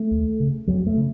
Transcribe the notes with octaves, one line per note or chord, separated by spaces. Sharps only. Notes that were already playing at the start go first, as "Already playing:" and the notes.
Already playing: A3
D#2
C#3
F2 F#3
A3
C#3